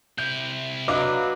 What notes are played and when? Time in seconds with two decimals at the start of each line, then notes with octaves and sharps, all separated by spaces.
0.18 C3 E4 G6
0.88 F#3 D4 B4 D#5 F5 D6